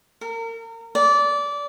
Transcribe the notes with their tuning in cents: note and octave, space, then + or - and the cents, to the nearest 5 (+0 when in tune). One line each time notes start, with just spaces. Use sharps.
A#4 -35
D5 -20